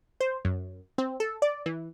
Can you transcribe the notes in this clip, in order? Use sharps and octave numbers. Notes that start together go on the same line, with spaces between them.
C5
F#2
C4
A4
D5
E3